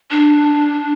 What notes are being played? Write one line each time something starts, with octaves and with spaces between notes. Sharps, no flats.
D4